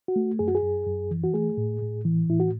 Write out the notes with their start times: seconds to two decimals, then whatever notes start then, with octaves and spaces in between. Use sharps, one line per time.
0.08 F#4
0.16 A3
0.39 F#2 G#4
0.48 F#4
0.55 G#4
0.63 F#2
0.86 F#2
1.11 E3
1.23 F#4
1.34 A3 G#4
1.57 A2
1.82 A2
2.05 E3
2.29 A2 E4
2.40 F#4